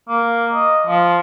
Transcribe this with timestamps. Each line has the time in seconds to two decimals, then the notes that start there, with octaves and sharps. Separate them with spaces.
0.08 A#3
0.54 D#5
0.87 F3